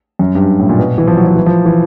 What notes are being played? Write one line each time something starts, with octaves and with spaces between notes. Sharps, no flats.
F#2
G2
A2
A#2
B2
E3
F3
F#3
F3
E3
F3
E3